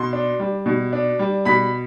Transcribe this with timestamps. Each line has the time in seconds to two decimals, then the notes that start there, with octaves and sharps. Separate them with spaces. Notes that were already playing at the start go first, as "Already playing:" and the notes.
Already playing: B2 C6
0.13 D4
0.40 G3
0.66 B2
0.93 D4
1.19 G3
1.45 B2 B5 B6